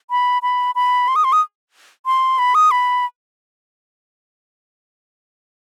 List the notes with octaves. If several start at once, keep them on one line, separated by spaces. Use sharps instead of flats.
B5
B5
B5
C6
D#6
C6
D#6
C6
B5
D#6
B5